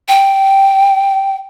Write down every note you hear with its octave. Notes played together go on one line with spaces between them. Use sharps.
G5